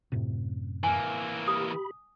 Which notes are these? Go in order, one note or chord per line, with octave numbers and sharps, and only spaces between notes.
F#2 A2 C3
E3 A#3 G#5
G4 B5 D#6